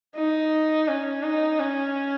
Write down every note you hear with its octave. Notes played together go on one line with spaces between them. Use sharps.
D#4
C#4
D#4
C#4